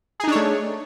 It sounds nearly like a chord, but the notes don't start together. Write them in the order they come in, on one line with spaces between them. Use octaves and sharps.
G#4 D#4 D4 C#5 A3